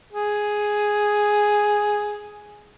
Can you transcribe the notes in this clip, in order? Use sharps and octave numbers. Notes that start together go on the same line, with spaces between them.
G#4